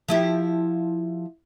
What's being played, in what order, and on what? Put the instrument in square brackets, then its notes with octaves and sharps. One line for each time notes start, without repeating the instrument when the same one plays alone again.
[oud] F3 E4 G4